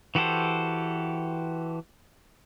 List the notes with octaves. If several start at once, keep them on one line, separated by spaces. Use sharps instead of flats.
E3 F#4 G4 A4 C5